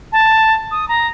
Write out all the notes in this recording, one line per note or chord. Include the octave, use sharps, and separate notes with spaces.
A5
D#6
A#5